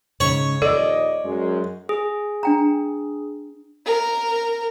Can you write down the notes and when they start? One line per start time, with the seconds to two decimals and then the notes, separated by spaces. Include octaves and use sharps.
0.20 G#2 C#3 C#5
0.62 A#1 D#2 A4 D5 D#5
1.25 F#2 G#3
1.89 G#4
2.43 D4 G5 A#5
3.86 A#4